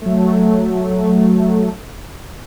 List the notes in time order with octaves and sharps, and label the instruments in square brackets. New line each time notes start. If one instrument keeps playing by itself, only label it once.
[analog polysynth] F#3 A3